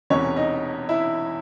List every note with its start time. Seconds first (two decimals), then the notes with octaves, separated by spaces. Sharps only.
0.10 E1 E2 C3 E3 C#4 C#5
0.36 D#4 D#5
0.89 E4 E5